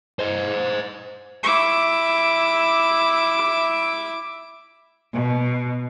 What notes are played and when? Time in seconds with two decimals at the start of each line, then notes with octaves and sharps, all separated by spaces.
0.19 C5 D#5
1.43 E4 D6
5.13 B2